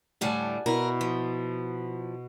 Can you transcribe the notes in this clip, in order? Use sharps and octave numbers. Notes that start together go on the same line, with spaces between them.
D2 A2 G3 F#5 G#5 A5
B2 E4 A#4
F3